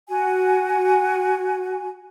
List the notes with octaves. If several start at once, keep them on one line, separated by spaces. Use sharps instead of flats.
F#4 G#5